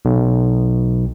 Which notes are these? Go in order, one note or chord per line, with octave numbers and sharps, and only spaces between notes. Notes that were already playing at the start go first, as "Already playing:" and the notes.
B1